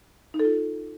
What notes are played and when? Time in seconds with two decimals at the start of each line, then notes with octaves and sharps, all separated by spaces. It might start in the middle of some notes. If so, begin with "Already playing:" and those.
0.34 D#4
0.40 A4
0.45 F4